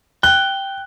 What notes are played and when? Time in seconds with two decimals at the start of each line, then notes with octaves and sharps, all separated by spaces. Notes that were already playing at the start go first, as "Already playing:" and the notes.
0.23 G5 F#6